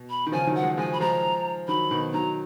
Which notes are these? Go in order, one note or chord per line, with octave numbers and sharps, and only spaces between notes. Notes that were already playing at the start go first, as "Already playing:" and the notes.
Already playing: B2
B5
D#3
C#3 F3 G#5
D#3 F#3
F#5
F3 G#3
F3 G#3 G#5
B5
F3 G#3 A#5
D#3 F#3 B5
B2 D#3
D#3 F#3 A#5